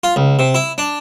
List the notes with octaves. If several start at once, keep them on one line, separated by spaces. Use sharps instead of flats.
F4
C#2
C3
E4
D4